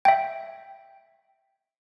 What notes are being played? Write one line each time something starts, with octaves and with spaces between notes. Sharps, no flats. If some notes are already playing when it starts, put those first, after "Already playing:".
E5 G5